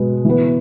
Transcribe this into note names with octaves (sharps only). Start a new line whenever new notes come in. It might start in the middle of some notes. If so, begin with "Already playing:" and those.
Already playing: B2 G#3 B3
E3 B3